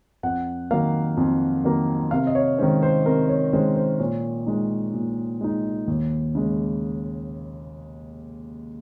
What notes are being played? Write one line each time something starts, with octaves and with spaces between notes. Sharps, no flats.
F2 F#5
D#3 F#3 A#3 F5
F2
D#3 F#3 A#3
C3 F5
D#5
C#5
D#3 G#3 C#4 C5
C5
C3 A#4
C#5
D#3 G#3 C#4 C5
C5
A#2 C#5
G#3 D#4
A#2
G#3 D#4
D#2
C#3 G#3